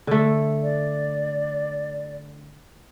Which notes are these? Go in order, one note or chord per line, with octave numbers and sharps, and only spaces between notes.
D3 A3
D5